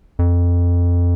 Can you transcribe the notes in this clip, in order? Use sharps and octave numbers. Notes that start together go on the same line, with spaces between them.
F2